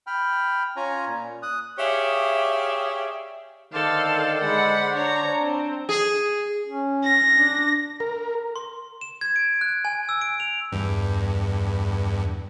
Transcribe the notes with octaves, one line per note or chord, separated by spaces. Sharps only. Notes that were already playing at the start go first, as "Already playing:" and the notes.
G5 B5 F6
C#4 F4 C#5 G#5 A#5
A#2
D#6 F#6
G4 G#4 C#5 D5 E5 F5
D3 D#3 A4 C5 D5 F5
G#3 F#5 B5
D4 C#5 A#5
C4
G#4
C#4
A#6
D4
A#4
C6
E7
G#6
D7
F#6
G#5
E6
D7
F7
E2 G2